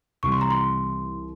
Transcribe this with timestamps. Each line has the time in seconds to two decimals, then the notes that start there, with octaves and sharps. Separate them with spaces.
0.23 C2 C3 E3 G3 C#6
0.32 C6
0.41 A#5
0.50 C6